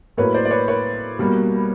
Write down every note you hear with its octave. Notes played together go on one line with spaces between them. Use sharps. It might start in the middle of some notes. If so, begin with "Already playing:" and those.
A2 F#3 A#3 B4 C#5
C5 D5
D5
B4 C#5
B4 C#5
B2 G3 A#3